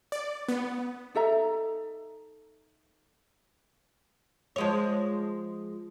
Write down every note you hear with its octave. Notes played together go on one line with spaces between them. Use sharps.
D5
B3
D#4 A4 E5 A#5
F3 G#3 C#5